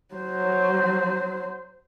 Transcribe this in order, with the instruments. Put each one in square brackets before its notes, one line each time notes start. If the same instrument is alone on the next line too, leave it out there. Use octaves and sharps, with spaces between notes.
[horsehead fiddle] F#3 C5